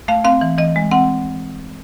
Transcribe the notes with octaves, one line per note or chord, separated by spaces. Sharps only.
A3 F5
C4 F5
E3
E3 D#5
G#3
C4 F#5